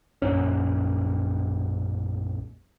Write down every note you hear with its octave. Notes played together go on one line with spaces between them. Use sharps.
A#1 F#2 C#4